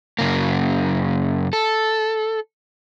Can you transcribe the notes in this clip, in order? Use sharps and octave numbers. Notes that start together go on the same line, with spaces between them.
F#2 C#3 A#3
A4